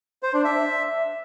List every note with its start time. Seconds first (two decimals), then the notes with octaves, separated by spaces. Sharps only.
0.23 C5
0.34 D4
0.45 E5